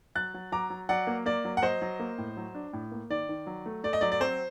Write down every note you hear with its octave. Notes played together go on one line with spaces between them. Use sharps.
F#3 F#6 A6
F#3
F#3 A#5 D6
F#3
F#3 D5 F#5
A#3
A#3 D5
F#3
F#5
F#3 C5 D#5
F#3
A#3
A2
F#3
D4
A2
A#3
D#3 D5
D#3
F#3
A3
A3 D5
D#5
F#3 D5
D5
C4 C5